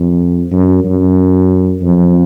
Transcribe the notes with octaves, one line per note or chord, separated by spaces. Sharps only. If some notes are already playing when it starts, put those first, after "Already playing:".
Already playing: F2
F#2
F#2
F2